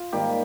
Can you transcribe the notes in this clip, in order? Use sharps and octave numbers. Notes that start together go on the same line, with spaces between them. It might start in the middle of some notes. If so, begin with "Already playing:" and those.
Already playing: F4
G#2 D#3 G3 A#3 G4